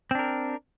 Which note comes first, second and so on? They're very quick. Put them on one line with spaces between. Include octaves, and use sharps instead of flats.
C4 D4 A#4